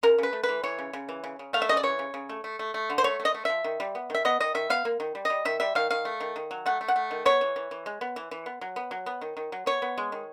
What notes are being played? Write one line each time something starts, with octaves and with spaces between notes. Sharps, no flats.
C#3 A#4
C#3 B4
A3
B4
E3
E3 C#5
C#3
C#3
E3
C#3
C#3
A3 F5
E5
C#3 D#5
D5
E3 C#5
C#3
C#3
A3
A3
A3
A3
D3
C5
A3 C#5
A3
D#5
A3
F3 E5
D#3
G3
B3
D#3 E5
B3 D#5
D#3 D#5
D#3 E5
B3 F5
A#3
D#3
G3
G3 D#5
D#3 E5
G3 E5
D#3 F5
D#3 F5
A3
D#3
D#3
F#3
A3 F#5
A3
F#5
A3
D#3
B3 C#5
E3
E3
E3
G#3
B3
E3
E3
B3
F#3
B3
F#3
B3
D#3
D#3
F#3
B3 C#5
B3
G#3
D#3